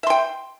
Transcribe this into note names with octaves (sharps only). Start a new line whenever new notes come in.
E5 G5 C6